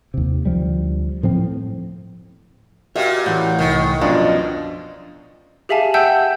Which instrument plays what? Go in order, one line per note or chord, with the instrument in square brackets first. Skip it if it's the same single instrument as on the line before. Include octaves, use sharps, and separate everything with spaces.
[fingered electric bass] D#2 C3
D2 F3 G3
A2 F3 C4
[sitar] A#2 [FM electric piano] F#4 G4 F5 [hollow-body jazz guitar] E5
[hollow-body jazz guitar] A2 E3 [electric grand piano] F#5 G6
[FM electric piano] C2 [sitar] D#3
[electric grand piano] F#2 B2 F3 [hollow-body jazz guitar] D4 [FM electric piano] F4
[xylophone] G4 G#4 E5 F5 G#5 A5
E5 F#5 G5 A5 E6 G6